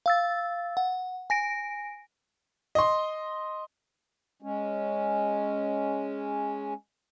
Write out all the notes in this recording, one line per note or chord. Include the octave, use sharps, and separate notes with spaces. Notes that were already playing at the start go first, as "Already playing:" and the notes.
F5 E6 A6
F#5
G#5 A#6 D7
D#5 C6
G#3 C#4